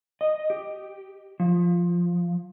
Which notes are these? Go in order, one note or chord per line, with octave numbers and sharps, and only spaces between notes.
D#5
G4
F3